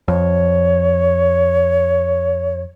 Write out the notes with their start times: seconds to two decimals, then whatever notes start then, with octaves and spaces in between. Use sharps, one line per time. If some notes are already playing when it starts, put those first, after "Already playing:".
0.08 F2 C#5